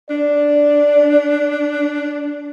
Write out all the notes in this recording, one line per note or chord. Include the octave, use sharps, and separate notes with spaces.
D4 D5